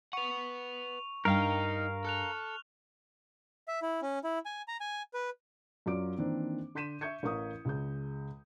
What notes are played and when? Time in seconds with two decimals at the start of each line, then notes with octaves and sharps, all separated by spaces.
0.13 B4 F#5 C#6 F7
1.25 G2 D#4 A#4 F5 G5
2.05 A4 F6 F#6 F7
3.68 E5
3.82 E4
4.02 C#4
4.24 E4
4.46 G#5
4.68 A#5
4.80 G#5
5.14 B4
5.86 F#2 F#3 F4 D5 D6 D7
6.18 D#3 E3 A#3 C4 D4
6.75 D3 C6 G6 B6 D#7 E7
7.01 E5 C#6 G6 G#6 C#7
7.23 A1 A#4 F5 C#6 D#6
7.65 C#2 G#3 G6